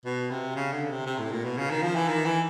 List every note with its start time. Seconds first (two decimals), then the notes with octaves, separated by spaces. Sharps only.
0.05 B2
0.31 C3
0.56 C#3
0.72 D3
0.90 C3
1.06 C3
1.19 A2
1.31 A#2
1.44 B2
1.58 C#3
1.70 D#3
1.83 F3
1.96 E3
2.08 D#3
2.25 E3